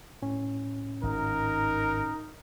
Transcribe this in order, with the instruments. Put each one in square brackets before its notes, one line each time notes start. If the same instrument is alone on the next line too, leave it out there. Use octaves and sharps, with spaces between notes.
[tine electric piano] A2 C#4
[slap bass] G#1 [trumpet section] D#4 A#4